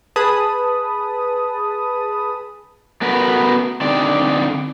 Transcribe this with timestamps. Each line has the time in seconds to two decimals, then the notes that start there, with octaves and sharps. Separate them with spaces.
0.16 G#4 B4 A5 B5 D#6
3.01 A3 B3 F#4 A#4 B4
3.81 D3 C4 D#4 D5